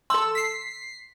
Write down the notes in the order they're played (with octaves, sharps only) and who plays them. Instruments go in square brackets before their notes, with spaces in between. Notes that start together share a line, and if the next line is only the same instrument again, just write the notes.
[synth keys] A4 E6 [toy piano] C6
[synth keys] B6 C7